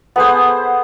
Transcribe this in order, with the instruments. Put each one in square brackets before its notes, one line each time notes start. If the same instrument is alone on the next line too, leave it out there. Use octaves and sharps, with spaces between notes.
[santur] B3 C5 [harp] G#4 A4 F#5